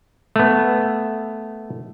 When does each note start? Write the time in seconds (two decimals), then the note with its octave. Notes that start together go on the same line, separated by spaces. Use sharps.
0.36 A3 B3